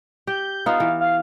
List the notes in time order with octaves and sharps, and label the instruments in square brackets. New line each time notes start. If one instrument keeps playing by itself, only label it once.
[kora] G4 [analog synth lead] G6
[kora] B3 D#4 F4 [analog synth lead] F5
[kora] E3
[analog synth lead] F5